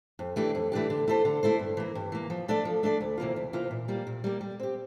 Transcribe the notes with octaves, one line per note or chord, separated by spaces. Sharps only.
F2
E3 A3 D4 G4
F2
E3 A3 D4 G4
D3
A3 E4 A4 C5
D3
A3 E4 A4 C5
G2
E3 A#3
G2
E3 A#3
F3
A3 D4 A4 D5
F3
A3 D4 A4 D5
D2
C3 E3 A#3 F4
D2
C3 E3 A#3 F4
A#2
G3 A#3
A#2
G3 A#3
G3
C4 G4